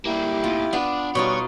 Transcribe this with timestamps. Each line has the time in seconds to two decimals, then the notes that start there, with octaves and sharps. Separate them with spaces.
0.05 G3 A#3 E4 G4
0.44 D#2 A2 F4
0.73 B3 D4
1.15 B2 G3 D#4 F4 F#4 C#5